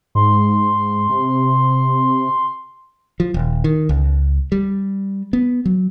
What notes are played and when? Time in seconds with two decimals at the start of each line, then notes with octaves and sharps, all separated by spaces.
0.15 G#2 C6
1.09 C3
3.20 F3
3.34 D#1
3.64 D#3
3.89 C#2
4.52 G3
5.33 B3
5.66 F#3